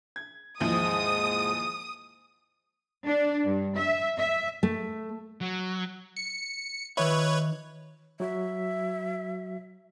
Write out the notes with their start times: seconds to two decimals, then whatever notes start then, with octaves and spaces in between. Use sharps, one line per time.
0.16 G#6
0.60 D#2 G#2 E3 F3 G#3 D#6
3.06 D4
3.44 G2
3.77 E5
4.18 E5
4.63 A3
5.41 F#3
6.17 C#7
6.97 D#3 B4 C#5 E5
8.20 F#3 F#4 E5